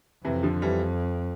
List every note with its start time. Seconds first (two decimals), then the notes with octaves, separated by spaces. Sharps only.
0.24 F2 C3 E3
0.43 D3 F3
0.62 E3 G3